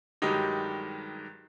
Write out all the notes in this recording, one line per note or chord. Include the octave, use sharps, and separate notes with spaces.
G2 D#3 F#3 G#3 D#4 G4